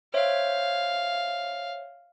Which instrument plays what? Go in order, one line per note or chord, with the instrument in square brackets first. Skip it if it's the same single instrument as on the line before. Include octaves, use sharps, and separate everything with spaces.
[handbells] C5 C#5 E5 [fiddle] F5